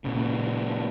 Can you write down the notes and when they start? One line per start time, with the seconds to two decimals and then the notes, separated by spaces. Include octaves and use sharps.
0.04 A#2 C#3